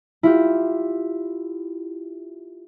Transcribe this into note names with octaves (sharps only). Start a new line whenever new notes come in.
E4 F4 G4